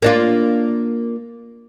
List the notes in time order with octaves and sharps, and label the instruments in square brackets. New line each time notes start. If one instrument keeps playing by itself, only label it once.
[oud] A#3 D4 F4